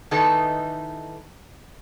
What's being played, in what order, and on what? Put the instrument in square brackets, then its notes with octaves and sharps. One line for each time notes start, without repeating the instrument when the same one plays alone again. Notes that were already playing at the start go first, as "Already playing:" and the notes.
[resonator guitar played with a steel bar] D#3 E3 D#4 A4 B4